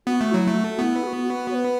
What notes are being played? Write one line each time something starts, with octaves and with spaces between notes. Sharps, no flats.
B3 F#4
A3
F#3 E4
A3
F#4
B3 E4
A4
F#4
F#4
C#5
B4